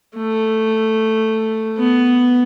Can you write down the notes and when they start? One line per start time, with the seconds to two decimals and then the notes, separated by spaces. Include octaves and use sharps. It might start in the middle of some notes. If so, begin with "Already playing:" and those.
0.17 A3
1.78 B3